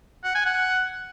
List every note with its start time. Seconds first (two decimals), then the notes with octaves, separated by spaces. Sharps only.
0.24 F#5
0.35 G#5
0.46 F#5